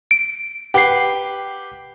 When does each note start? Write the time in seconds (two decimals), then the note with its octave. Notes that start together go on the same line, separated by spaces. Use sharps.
0.11 D7
0.74 G4 B4 F#5 G5 C7